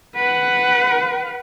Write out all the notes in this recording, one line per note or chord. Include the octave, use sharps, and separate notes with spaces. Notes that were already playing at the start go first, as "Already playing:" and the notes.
B4 F#5